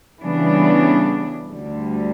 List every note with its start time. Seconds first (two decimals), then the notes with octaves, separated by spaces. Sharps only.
0.23 C#3 E3 G3 B3 D4
1.51 D2 D3 G3